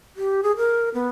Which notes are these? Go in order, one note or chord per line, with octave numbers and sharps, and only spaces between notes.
G4
G#4
A#4
B3